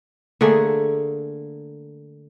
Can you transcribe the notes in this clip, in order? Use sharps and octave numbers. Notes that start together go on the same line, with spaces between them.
D3 A3 A#3 G#4